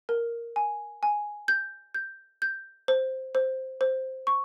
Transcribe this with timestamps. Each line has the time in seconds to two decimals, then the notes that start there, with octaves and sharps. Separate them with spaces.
0.09 A#4
0.56 G#5
1.03 G#5
1.48 G6
1.94 G6
2.42 G6
2.88 C5
3.35 C5
3.81 C5
4.27 C#6